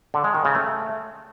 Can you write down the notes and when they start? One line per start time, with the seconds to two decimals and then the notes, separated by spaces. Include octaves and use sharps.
0.14 D3
0.24 G#3
0.35 D#3
0.45 C#3
0.55 A3